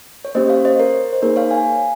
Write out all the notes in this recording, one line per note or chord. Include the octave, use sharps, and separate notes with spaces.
C#5
A#3 C#4 G4 C5 D#5
C#5 F5
C5 D#5
A#4 C#5
C5
A#3 D#4 G#4 A#4 C#5
C#5 F5
F5 G#5